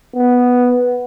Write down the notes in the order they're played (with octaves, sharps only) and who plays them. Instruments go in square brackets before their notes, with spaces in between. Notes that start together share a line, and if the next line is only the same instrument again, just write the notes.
[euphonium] B3